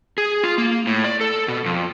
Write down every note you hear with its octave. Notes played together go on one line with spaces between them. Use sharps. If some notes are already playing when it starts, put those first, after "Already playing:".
G#4
F4
A#3
A2
D5
A4
B2
F2